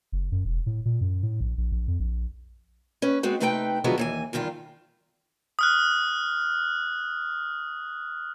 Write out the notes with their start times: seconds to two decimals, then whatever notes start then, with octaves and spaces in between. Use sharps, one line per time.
0.12 F#1
0.32 F#2
0.45 E1
0.66 A2
0.85 A#2
1.01 F#2
1.23 A2
1.41 A#1
1.58 A#1
1.72 A#1
1.88 F2
2.00 A#1
3.02 C#4 B4
3.23 G#3 B3 C4 F#4
3.40 C3 A3 D#4 B4 F#5 G5
3.84 D3 F3 F#3 G#3 A3 B3
3.98 D#2 E3 G#5
4.33 E2 G2 D#3 F4
5.59 D#6 F6 F#6